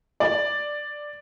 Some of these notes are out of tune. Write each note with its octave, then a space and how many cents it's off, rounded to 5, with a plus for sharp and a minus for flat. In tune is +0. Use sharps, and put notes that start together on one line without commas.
D5 +5